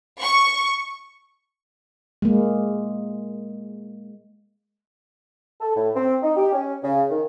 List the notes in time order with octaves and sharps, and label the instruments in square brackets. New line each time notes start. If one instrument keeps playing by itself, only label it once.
[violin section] C#6
[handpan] G#3 A#3
[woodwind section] A4
A2
C4
D#4
G4
C#4
C#3
D#3